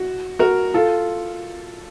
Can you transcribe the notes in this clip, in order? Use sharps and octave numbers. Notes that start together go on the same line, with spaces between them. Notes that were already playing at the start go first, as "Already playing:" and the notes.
Already playing: F#4
F#4 A#4
F4 A4